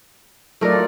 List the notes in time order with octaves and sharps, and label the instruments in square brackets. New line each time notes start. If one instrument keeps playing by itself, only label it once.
[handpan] F#3 F4 D5 [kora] A3 D#4 A#4